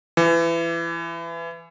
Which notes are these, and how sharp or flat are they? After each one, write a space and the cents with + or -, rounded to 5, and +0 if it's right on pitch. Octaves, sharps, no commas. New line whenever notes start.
E3 +25